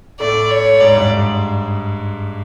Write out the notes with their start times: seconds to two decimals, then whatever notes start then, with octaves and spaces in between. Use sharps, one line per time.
0.20 A2 A3 D5
0.51 C#5
0.80 G#2 G#3 D5
0.95 G2 G3